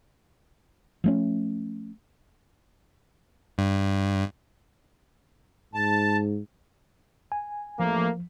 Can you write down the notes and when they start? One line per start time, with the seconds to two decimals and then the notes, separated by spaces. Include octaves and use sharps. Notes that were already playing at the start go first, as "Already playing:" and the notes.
1.04 F3 A3 C#4
3.58 G2
5.74 G#2 A5
7.32 G#5
7.80 A1 F3 A3 A#3